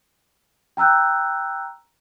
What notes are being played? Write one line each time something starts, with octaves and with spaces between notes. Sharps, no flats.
G5 A#5 E6 F#6 G6